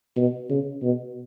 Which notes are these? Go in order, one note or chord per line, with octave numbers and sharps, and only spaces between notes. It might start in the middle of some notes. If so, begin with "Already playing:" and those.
B2
C#3
B2